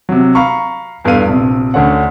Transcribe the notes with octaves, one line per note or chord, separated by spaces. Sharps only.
C3 F#3
F5 A#5 B5 C#6
E2 G2 B2 A4 F5 D#7
A#1 C3
D2 D3 C#4 F#5